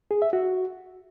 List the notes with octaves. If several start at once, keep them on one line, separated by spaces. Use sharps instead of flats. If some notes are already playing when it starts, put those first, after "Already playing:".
G#4
E5
F#4